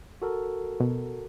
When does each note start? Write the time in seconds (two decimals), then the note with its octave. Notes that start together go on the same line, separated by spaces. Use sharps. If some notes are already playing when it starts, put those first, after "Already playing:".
0.22 F#4 A4 A#4
0.80 B2